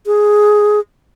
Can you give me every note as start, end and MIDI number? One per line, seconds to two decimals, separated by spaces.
0.06 0.80 68